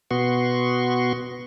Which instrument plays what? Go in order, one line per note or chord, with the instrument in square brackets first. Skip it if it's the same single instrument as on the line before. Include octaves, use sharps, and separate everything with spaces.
[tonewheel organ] B2 B3 F#4 C6 C#6